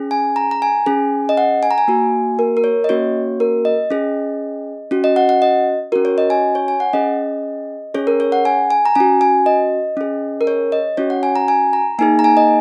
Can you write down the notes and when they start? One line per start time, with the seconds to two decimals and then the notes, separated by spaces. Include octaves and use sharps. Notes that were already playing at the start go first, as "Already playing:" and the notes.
Already playing: C#4 G#4
0.11 G#5
0.36 A#5
0.51 A#5
0.62 G#5
0.86 C#4 G#4
1.29 D#5
1.37 F#5
1.63 G#5
1.71 A#5
1.78 G#5
1.88 A#3 F#4
2.39 A#4
2.57 A#4
2.64 C#5
2.84 D#5
2.89 A#3 C#4 F#4 C#5
3.40 A#4
3.65 D#5
3.90 C#4 G#4
4.91 C#4 F#4
5.04 D#5
5.16 F#5
5.29 F#5
5.42 D#5
5.92 C#4 F#4 A#4
6.05 C#5
6.18 D#5
6.30 G#5
6.55 C#5
6.68 G#5
6.80 F#5
6.93 C#4 G#4 D#5
7.94 C#4 G#4 C#5
8.07 A#4
8.20 C#5
8.32 F#5
8.45 G#5
8.71 G#5
8.86 A#5
8.95 C#4 F#4 G#5
9.21 G#5
9.46 D#5
9.97 C#4 G#4
10.41 A#4
10.47 C#5
10.72 D#5
10.97 C#4 F#4 C#5
11.10 F#5
11.23 G#5
11.36 A#5
11.48 G#5
11.73 A#5
11.99 A#3 D#4 G#4 G#5
12.19 A#5
12.24 G#5
12.37 D#5